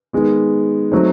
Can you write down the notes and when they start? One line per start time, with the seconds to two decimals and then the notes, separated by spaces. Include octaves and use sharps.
0.13 D#3 G#3 B3
0.92 F#3 A3 C4 D#4